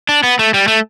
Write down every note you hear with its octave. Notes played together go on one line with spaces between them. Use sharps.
D4
B3
A3
G3
A3